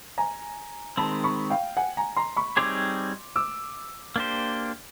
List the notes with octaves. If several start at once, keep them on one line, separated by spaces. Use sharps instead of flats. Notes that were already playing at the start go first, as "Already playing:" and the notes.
G#5 A#5
D#3 G#3 C4 A5 B5
B5 C#6
F5 G5
F#5 G#5
G#5 A#5
A#5 C6
B5 C#6
G3 C4 D#4 G#4 C#5 C6 D6
D6 E6
A#3 D4 G4 C5